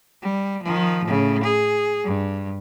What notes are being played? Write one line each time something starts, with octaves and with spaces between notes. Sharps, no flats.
G3
D#3 F3
A2 C#3
G#4
G2